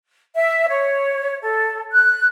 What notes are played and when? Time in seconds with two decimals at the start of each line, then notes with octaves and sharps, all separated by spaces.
0.35 E5
0.68 C#5
1.42 A4
1.92 F#6